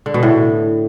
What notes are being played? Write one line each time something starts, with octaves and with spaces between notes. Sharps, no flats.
D3
B2
A2